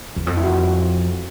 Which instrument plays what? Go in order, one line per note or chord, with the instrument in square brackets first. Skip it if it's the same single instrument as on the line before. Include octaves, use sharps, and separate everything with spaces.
[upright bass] E2
F2
[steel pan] E4
F#4
F4
F#4